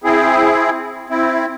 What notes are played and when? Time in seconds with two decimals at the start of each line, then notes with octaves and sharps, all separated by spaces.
0.04 C4 E4 G#4
1.10 C4 E4